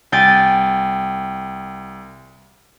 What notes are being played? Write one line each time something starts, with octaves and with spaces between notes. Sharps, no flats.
C2 G5 G#5 A6